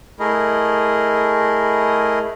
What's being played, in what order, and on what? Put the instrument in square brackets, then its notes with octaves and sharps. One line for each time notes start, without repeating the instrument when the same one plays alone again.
[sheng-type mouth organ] A3 E4 G#4 A#4 D#5